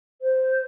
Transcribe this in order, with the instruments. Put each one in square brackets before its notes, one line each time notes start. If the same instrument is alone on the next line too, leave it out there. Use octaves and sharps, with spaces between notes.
[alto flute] C5